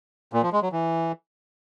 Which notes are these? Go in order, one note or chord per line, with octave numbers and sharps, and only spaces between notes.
A#2
F3
G#3
F#3
E3